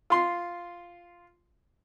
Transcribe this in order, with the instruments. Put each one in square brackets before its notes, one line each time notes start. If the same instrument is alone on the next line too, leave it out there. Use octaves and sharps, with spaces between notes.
[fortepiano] F4 C6